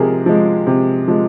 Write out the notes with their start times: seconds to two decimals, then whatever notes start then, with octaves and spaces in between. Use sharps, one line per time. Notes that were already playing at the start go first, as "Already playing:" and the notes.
Already playing: C3 F3 G#3 G#4 A#4
0.26 F3 G#3
0.67 C3
1.08 F3 G#3